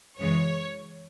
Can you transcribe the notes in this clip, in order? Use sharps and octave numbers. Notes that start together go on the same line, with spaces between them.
F#2 C#3 E3 G#3 C#5